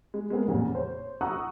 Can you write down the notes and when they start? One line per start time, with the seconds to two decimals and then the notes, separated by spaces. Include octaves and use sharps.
0.14 G#3
0.30 G#3 A3 B3 C4 G#4 A#4
0.48 A1 F2 A#2 C#3
0.74 C5 C#5
1.21 F#5 A#5 C#6 D#6 E6 F#6